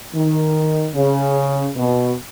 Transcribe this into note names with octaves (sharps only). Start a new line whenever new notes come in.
D#3
C#3
B2